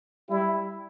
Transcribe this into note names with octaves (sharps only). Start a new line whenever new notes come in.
G3 E4